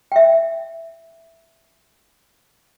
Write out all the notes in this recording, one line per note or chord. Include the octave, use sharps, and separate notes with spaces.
E5 G5